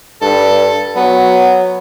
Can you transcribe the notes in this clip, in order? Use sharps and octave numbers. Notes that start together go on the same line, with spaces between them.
G2 A4
F#3 B3